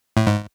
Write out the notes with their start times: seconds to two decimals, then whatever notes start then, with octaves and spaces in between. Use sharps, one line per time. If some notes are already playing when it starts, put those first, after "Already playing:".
0.17 A2
0.27 G#2